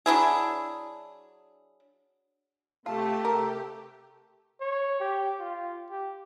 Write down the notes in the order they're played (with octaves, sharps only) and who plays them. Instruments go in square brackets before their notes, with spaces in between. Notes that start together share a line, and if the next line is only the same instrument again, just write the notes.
[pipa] F#3 D4 E4 G#4
[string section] C3 A3 [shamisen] F4 [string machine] G4 [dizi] A5
[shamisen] A#4
[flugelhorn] C#5
G4
F4
G4